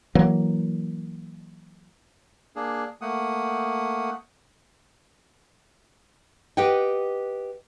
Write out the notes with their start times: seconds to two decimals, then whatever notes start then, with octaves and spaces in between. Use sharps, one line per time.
0.15 E3 F#3 A#3
2.56 A#3 D4 G#4
3.01 A3 A#3 F#5 D#6
6.57 G4 B4 D#5 F#5 G5